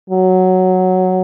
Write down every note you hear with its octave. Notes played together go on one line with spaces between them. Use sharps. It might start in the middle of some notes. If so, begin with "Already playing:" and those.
F#3